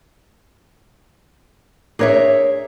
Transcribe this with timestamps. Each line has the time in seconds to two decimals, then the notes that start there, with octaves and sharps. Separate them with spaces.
1.99 D4 G#4 A#4 C#5 E5